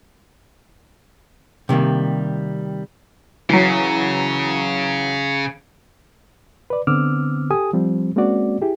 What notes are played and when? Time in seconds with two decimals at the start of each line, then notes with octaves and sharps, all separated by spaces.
1.69 C3 D#3 G3 A#3
3.50 C#3 E3 F#3
6.70 B4 D5
6.87 D3 B3 C4 D6 E6 F6
7.51 G4 A4 G#5 D#6
7.73 F3 G3 C4
8.16 G#3 A#3 C4 C#4 F#4 D5
8.62 E4 G4 G#4